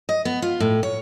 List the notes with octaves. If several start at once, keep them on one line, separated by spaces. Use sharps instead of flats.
D#5
B3
F4
A2
C#5